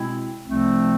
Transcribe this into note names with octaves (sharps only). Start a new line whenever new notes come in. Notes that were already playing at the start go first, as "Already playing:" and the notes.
Already playing: B2 G#3 C4 E4
C2 C3 F3 A3 C4